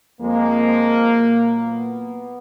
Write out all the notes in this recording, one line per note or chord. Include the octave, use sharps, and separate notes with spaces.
F2 F3 G#3 A#3
A#2 F#3
B3